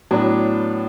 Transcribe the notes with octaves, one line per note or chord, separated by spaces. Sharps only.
A2 F#3 B3 D4